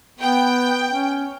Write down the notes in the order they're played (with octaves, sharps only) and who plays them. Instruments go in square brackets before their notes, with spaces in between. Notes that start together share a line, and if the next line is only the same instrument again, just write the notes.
[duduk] B3 [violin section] G5
[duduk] C#4